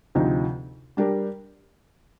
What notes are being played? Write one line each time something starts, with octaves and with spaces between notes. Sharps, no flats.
D2 C3 F3 C4 D#4
G3 D4 G4 A#4